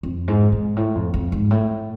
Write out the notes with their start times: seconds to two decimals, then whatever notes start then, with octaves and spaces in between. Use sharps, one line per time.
0.03 F2
0.28 G#2
0.52 G#2
0.76 A2
0.95 F2
1.14 F2
1.32 G#2
1.51 A2